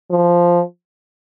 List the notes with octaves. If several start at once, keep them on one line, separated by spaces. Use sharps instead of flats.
F3